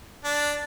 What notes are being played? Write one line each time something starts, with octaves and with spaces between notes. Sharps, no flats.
D4